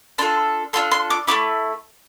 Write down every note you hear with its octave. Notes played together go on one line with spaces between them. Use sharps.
D4 F4 A4 C6
D4 F4 A4 C6
C6
D6
A3 C4 E4 D6